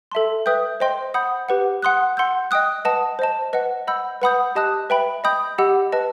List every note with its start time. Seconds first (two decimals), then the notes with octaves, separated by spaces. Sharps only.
0.12 A4 E5 A5 C6
0.46 B4 E5 G5 D#6 G6
0.80 C5 D#5 G5 C6
1.14 F#5 B5 D#6 G6
1.49 G4 B4 F#5
1.82 F#5 C6 D#6 F#6
2.17 F#5 C6 E6 G6
2.51 D#5 G5 D#6 F#6
2.85 B4 D#5 F#5 A5 D#6
3.19 C5 D#5 A5
3.53 B4 D#5 F#5
3.87 D#5 F#5 B5 E6 G6
4.22 B4 F#5 B5 D#6 G6
4.55 G4 D#5 A5 D#6 F#6
4.90 B4 E5 G5 B5
5.24 D#5 G5 B5 D#6 G6
5.58 G4 D#5 F#5 B5 E6
5.92 B4 D#5 A5